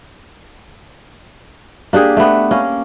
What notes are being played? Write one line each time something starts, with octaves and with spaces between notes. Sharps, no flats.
A#3 D4 G4 G#4
A3 B3
A#3 C#4